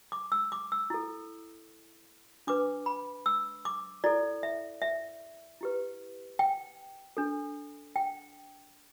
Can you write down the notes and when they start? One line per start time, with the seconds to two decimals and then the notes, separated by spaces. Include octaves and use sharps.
0.12 D6
0.32 E6
0.52 D6
0.72 E6
0.90 E4 A4
2.47 D4 B4 D6
2.86 B5
3.26 E6
3.65 D6
4.04 E4 A4 D5
4.43 E5
4.82 E5
5.61 E4 G4 B4
6.39 G5
7.17 D4 A4
7.96 G5